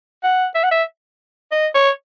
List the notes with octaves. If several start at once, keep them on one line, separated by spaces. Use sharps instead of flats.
F#5
E5
F#5
E5
D#5
C#5